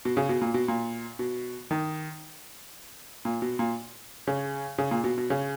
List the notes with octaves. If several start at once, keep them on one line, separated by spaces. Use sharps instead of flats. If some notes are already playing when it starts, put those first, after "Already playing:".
B2
C#3
B2
A#2
B2
A#2
B2
D#3
A#2
B2
A#2
C#3
C#3
A#2
B2
B2
C#3